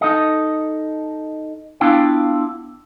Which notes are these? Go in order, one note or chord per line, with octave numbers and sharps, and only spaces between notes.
D#4 A4 D#5
B3 D4 E4 F4 F5 G5